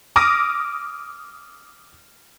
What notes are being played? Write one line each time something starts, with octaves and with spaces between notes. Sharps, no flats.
D6 D#6 F6 A#6 D7 D#7